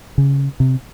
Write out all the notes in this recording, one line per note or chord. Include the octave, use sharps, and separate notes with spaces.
C#3
C3